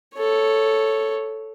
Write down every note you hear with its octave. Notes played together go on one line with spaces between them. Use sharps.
A4 C#5